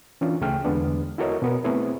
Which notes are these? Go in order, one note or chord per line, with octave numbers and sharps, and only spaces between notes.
E3 C#4 D4 F4
D2 C#3 A3 G#4 G5 F6
E2 D3 G#3 B3 D4
E4 F#4 A4 A#4 C#5 D#5
B2 B3 A#4
A3 B3 C4 E4 G#4